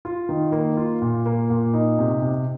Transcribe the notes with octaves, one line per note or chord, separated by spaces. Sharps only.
F4
D#3
A#3
F4
A#2
A#3
A#2
D#4
C3
C3